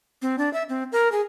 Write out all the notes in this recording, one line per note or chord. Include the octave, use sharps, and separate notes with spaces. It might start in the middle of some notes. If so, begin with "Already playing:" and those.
C4
D4
E5
C4
A#4
G#4